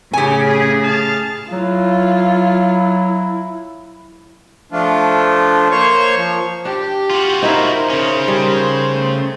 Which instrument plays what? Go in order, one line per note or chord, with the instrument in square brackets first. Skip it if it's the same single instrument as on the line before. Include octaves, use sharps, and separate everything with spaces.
[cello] A2 C#3 [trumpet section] C4 C#5 [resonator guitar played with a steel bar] G4 G#5
[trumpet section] G#4
G#4 F5 A5
[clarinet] F#3 [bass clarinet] E4 [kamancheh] F4
[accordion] F3 A3 D4 F4
A#3 C5 C#5 C#6
F3
[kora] D4 [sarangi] G4
[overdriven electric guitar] F4 F#4
[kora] D#4 E4 E5 [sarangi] A#4 [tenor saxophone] C5
[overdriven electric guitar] C#3 C#4
[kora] G3 [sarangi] A#4
[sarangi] A3